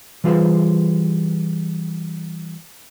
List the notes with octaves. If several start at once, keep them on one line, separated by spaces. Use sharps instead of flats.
E3 G3 F4 G#4 B4 C5